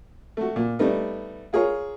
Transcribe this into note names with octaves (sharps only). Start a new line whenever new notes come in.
A3 F#4
A#2
G3 A3 B3 D#4
F4 G#4 A#4 C#5